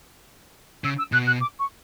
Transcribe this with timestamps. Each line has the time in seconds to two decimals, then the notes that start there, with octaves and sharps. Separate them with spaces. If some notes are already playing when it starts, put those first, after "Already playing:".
0.84 C#3 E6
0.98 E6
1.12 B2 F#6
1.27 F#6
1.40 D6
1.59 C#6